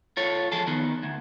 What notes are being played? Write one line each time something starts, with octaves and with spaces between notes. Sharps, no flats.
F4 A4 C#5
F3 G#4 A4
D#3 B3
D2